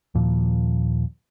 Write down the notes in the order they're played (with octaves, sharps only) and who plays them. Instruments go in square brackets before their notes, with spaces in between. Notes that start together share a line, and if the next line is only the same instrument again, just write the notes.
[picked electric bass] D#2 A#2 F3